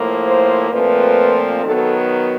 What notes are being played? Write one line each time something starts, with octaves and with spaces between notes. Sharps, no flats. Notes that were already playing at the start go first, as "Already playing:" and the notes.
Already playing: A2 F3 A#3
C5
A#2 F3 A3 C4 B4
D#3 F#3 B3 A4